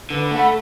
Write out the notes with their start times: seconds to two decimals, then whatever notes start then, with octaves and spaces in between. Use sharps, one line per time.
0.10 D3 B4
0.31 A3 F#5 B5